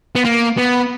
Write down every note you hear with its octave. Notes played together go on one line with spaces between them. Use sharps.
B3
A#3
B3